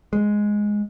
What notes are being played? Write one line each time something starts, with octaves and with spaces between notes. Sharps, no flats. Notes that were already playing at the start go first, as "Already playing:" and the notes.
G#3